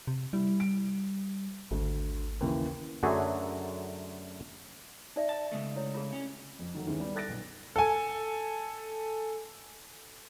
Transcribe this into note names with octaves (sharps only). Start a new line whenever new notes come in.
C3
G3 E4
D7
G#1 D2
D#2 C#3 E3
F#2 D3 F#3 A3 F#4 G#4
D#4 D5 E5
A5
C#3 G#3 A3
E4 C#5
F4 G#4
C#4
F2
D#3 F#3 A3
D#2 D#3 E3 G#3 C#4
G3 B3
A4 F#6 A6 A#6 D7
B1 A#2
A4 G#5